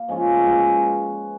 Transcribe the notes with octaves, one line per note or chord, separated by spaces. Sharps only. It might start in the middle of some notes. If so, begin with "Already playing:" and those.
Already playing: A#3
F3 G#3 C#4 F4
B2 G#3 B3